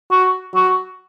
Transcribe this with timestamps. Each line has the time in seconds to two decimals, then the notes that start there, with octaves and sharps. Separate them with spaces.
0.11 F#4
0.55 F#4